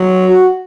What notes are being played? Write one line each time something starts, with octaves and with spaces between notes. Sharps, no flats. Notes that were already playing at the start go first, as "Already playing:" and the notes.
Already playing: F#3
F#4